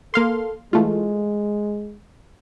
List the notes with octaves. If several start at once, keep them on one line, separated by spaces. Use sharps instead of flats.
A#3 A4 F5 C6
E3 G#3 A3 F4